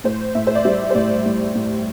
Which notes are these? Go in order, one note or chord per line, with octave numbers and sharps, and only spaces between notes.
A2 C5
A2 E5
C5
D5
G3 E5
C5
A2 D5
A2
A2